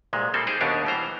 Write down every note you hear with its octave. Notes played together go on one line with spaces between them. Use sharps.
C2 A#2 G#3
G3 A#3 C4 A4 C5
D#4 G4 G#4 C5
D#2 B2 B3 D4 G4 C#5
E3 G3 C5 A#5